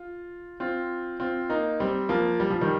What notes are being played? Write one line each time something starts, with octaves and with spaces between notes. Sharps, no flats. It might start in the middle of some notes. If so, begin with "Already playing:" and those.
Already playing: F4
C4 F4
C4 F4
A#3 D#4
G3 C4
F3 A#3
G3
F3
D#3 G3